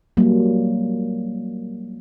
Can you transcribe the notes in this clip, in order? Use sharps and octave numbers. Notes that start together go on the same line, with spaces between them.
F#3 G3 A#3